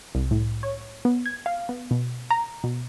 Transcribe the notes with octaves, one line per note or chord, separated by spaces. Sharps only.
C2
A2
C#5
B3
G#6
F5
B3
B2
A#5
B2